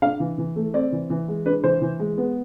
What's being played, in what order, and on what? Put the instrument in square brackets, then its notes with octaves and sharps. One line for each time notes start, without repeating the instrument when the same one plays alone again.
[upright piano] D4 F5
E3
E3
A3
C4 D5
E3
E3
G#3
D4 B4
E3 C5
E3
G#3
B3